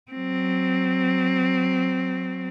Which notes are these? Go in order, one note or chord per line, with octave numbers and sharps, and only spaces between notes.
F#3 C4